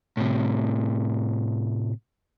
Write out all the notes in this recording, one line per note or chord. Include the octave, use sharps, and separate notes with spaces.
A2 C3